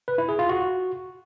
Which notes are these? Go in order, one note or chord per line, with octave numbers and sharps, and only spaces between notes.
B4
E4
G#4
F4
F#4